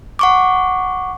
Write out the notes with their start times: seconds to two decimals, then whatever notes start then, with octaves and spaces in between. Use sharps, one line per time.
0.19 F#5 C#6 D6